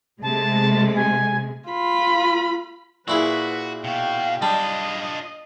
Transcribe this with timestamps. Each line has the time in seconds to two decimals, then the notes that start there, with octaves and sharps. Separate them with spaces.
0.23 C3 G#3 A3 A5
0.96 G#5
1.69 F4 B5
3.08 A#2 E4 F#4 G#4 B4
3.84 B2 F#4 F5 G5
4.42 G3 D4 F4 D5 D#5 A5